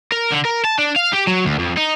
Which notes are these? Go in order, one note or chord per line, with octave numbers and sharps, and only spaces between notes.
A#4
D3
A#4
A5
D4
F5
G4
F#3
D2
F2
D#4